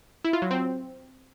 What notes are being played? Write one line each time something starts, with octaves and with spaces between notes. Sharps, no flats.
E4
F4
F#3
C4